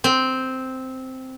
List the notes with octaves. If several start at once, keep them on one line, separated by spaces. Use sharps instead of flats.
C4